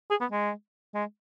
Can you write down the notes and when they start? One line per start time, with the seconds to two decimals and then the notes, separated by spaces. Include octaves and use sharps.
0.10 G#4
0.21 B3
0.32 G#3
0.94 G#3